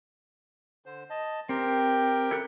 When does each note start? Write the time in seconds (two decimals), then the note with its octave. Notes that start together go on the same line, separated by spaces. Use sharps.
0.86 D3 C5
1.10 D#5 A5
1.49 C4 G4 A#4 G5
2.31 E4 A4 F#6